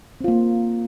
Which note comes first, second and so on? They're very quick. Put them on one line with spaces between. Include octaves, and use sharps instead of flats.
C4 F4 A#3